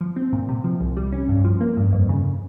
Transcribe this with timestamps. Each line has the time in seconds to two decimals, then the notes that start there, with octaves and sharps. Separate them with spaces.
0.01 F3
0.16 C4
0.33 A#2
0.49 C3
0.64 F3
0.80 C2
0.97 G3
1.12 C#4
1.29 G2
1.44 F3
1.60 A#3
1.77 G2
1.93 F2
2.09 C#3